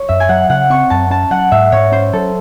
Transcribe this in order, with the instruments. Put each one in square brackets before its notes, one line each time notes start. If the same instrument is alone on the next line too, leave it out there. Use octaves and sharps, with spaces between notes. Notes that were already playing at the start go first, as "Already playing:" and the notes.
Already playing: [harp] C#5
[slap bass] F#2 [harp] E5
[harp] G#5
[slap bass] F#3 [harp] F#5
[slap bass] C#3 [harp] F#5
[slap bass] C4 [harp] C#6
[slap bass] F#2 [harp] A5
[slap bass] C#4 [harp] A5
[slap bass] F#3 [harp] F#5
[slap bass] G#2 [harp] E5
[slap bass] G#2 [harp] C#5
[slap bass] C#4 [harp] C5
[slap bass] F#3 [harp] A4